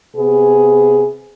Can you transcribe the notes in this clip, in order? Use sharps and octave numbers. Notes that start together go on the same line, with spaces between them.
C3 B3 G#4